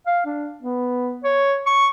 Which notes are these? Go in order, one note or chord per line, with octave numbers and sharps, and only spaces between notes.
F5
D4
B3
C#5
C#6